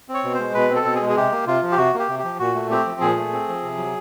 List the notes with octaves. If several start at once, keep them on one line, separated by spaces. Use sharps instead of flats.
C4
C#5
B2
G#3 C5
B2 B4
C4
A4
B2
G#4
G#3
G#4
C3 G4
A#3
C3 F4
F3
G4
C3 F#4
A#3
G4
C3
F3 G4
A#2 F#4
A3
C4 G4
F3
A#2 G#4
A3
C4
F3
C3
F#3